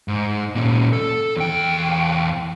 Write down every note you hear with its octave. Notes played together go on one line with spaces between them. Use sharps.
G#2
A#2 C#4
A4
E2 G5